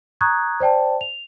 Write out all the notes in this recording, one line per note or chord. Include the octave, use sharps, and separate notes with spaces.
A#5 C#6 D#6 F#6 G#6
C5 D5 G5 A5
F7